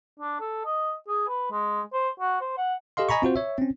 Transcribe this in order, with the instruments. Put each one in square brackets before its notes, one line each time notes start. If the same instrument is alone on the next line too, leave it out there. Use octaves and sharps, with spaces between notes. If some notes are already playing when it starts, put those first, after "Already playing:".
[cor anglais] D4
A4
D#5
G#4
B4
G#3
C5
F#4
C5
F#5
[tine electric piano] G4 A4 D#5 F5 C6
D#5 G#5 A#5 B5 C#6
C4 F4 F#4 C5
C#5 E5
C4 C#4